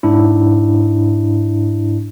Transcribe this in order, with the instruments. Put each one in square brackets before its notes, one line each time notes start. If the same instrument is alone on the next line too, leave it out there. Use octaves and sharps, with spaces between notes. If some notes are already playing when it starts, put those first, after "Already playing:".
[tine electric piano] G#2 D4 E4